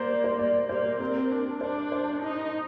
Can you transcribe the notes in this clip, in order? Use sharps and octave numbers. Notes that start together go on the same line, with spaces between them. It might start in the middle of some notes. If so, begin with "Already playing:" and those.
Already playing: A#3 C5 D5
C5
A#3 D5
A#3 C5
C4 A#4
D4
D4 C5
C5
D#4